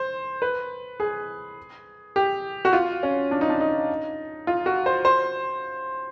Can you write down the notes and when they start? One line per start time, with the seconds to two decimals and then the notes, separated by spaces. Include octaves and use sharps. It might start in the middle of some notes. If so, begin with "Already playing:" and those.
Already playing: C5
0.42 B4
1.00 G#4
2.16 G4
2.65 F#4
2.73 F4
3.03 C#4
3.31 D4
3.41 D#4
3.50 D4
3.61 D#4
4.47 F4
4.66 F#4
4.86 C5
5.05 C5